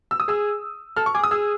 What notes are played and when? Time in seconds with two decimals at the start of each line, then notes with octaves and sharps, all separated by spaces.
0.11 E6
0.20 D#6
0.28 G#4 E6
0.96 A4 F6
1.06 C#6
1.14 G#4 D6
1.24 D#6
1.31 G#4 E6